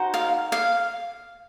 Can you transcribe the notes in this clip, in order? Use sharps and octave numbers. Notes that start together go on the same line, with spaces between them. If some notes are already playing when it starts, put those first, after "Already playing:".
Already playing: D#4 F#4 C5
F5
F5